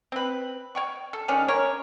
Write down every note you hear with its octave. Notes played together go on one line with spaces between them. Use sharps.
C4 B4
C#5 G5 C#6
A4
D#3 G#3 C#4 D4
C#4 A#4 C#5